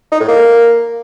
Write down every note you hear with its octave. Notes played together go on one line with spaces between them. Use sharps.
D#4
A2
A#3